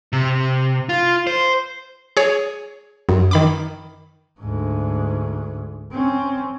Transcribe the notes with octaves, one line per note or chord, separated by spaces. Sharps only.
C3
F4
C5
G#4 C#5
F#2
D#3 B5 D6
D2 G#2
C4 C#4